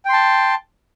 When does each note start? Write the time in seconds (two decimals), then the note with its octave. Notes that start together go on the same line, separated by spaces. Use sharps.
0.05 G5
0.09 C6
0.13 A5